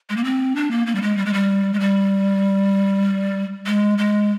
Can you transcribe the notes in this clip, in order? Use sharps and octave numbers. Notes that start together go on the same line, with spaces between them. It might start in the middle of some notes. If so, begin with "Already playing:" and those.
G#3
A#3
C4
D4
A#3
A#3
G3
G#3
G3
G#3
G3
G#3
G3
G#3
G#3